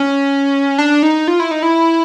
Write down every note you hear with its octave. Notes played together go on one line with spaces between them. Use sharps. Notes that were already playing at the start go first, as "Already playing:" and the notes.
Already playing: C#4
D4
D#4
F4
E4
D#4
E4